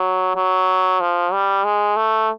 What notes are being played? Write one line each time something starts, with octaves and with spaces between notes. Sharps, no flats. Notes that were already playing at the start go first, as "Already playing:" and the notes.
Already playing: F#3
F#3
F3
G3
G#3
A3